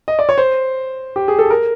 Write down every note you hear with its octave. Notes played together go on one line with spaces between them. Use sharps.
D#5
D5
C#5
C5
G4
G#4
A4
A#4